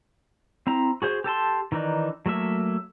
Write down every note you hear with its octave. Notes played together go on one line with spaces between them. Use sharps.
C4 E4 A#5
F#4 G#4 C5
G4 A4 A5 C6
D#3 E3 D4 D#4
F#3 A3 A#3 E5